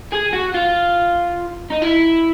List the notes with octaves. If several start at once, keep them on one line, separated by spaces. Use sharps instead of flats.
G#4
F#4
F4
D#4
E4